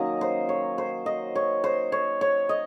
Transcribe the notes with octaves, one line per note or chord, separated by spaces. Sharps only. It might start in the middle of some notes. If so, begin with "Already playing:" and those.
Already playing: D#3 F#3 A#3 C#4 D#5
C5
C#5
C5
D#5
C#5
C5
C#5
C#5
D#5